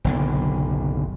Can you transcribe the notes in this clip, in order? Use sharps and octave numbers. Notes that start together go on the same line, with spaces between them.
F#1 B1 D3